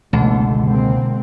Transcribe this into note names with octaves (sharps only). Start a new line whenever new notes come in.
G1 C#2 B2 D3 E3 A3
G#3 A#3 C4